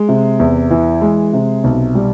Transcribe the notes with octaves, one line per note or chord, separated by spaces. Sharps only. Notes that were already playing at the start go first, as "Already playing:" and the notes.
Already playing: G#3
C3
E2
E3
G#3
C3
B1
G3